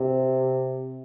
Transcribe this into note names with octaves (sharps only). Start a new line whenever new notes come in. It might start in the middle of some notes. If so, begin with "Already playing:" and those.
Already playing: C3